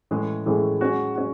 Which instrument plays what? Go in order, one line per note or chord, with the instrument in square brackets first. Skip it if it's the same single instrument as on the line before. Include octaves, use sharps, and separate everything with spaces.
[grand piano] A2 E3 G#3 C#4 G#4
A2 E3 G#3 C#4 G#4
G#3 C#4 F#4
C#4 F#4